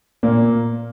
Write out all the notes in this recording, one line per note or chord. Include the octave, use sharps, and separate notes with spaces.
A#2 A#3